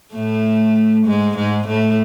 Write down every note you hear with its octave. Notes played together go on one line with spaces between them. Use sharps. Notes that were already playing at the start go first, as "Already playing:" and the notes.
A2 A3
G#2 G#3
G#2 G#3
A2 A3